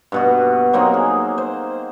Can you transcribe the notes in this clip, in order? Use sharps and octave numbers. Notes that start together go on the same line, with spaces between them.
G2 B2 F#4
F#3 A#3 C4 D#4
G#4
C5